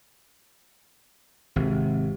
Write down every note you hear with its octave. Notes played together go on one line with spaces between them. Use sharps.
G#1 C3